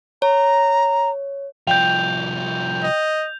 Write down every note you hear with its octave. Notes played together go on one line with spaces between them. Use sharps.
C#5 A#5
C2 F3 G5 G6 F7
D#5